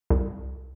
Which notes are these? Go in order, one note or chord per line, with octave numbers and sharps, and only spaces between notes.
C2